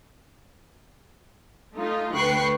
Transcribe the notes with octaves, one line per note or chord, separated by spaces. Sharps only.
A3 D#4 F4
D2 B4 G5 C#6 F#6 C7